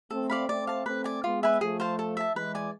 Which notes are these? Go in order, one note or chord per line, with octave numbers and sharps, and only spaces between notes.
A3 C4 A4
D5 F5 B5
A3 C4 D5
F5 A5
A3 C4 B4
D5 G#5
G#3 B3 F4
B4 E5 G#5
F3 A3 G#4
C5 F5 A5
A4
E5 A5
E3 G#3 B4
D5 G#5